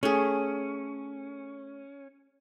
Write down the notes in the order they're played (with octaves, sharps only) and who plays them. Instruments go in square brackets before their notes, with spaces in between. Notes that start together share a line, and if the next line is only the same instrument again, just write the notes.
[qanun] A3 G#4 [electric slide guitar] C#4